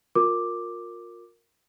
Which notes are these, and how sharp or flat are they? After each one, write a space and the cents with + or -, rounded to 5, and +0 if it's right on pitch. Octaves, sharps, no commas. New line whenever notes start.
F4 +30 A#4 -10 D6 +5